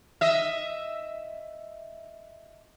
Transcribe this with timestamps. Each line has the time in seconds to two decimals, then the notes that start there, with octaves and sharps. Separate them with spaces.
0.21 D#5 E5